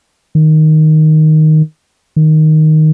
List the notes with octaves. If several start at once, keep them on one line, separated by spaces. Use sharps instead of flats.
D#3
D#3